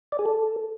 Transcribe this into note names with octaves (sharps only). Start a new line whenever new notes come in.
D5
G#4
A4